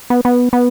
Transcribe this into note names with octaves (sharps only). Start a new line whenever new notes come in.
B3
B3
B3